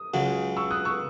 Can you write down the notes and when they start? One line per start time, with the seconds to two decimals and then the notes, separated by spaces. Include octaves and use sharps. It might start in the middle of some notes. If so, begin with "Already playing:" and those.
Already playing: D#6
0.14 C#2 C#3 F#3
0.57 C#6 E6
0.71 D#6 F#6
0.85 C#6 E6